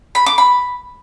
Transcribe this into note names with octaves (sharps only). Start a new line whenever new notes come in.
B5
D6
B5